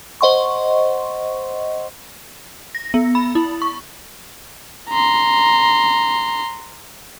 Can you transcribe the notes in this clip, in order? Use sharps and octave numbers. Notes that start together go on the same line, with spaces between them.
C5 D#5 F#5 C6 C#6
A#6
B3
B5
E4
C#6
A#5 C6